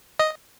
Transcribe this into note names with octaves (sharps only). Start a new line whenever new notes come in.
D#5